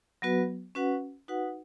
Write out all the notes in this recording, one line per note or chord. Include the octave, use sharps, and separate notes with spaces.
F#3 B3 F#4 B4
C#4 F#4 B4 F#5
D#4 F#4 B4 F#5